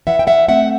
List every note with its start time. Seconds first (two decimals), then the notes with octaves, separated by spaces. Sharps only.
0.07 E3 E5 F#5
0.19 G5
0.27 E5 F#5
0.49 A3 C4 E5 F#5